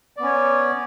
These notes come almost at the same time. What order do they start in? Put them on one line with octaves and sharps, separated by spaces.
D5 B3 C#4 C#5